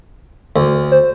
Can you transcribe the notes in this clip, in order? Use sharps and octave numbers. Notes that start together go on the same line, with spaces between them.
D2
C5